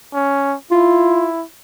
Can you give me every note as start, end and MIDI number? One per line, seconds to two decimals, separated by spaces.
0.14 0.55 61
0.71 1.44 64
0.71 1.27 65